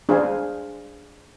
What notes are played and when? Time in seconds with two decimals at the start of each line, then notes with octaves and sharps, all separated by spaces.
0.09 D4 G#4 C5 F5 G#5